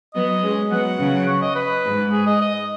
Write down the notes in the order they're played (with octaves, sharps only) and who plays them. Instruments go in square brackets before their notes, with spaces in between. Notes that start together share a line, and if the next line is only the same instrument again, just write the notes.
[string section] F#3 B3 [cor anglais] D#5
[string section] G#3 C#4
[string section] F#3 B3 [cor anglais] F#5
[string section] C#3 F#3
[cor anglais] C#5
D#5
B4
[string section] G#2
[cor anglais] G#4
D#5
D#5